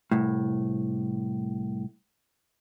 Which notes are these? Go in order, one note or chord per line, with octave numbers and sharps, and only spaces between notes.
C2 A2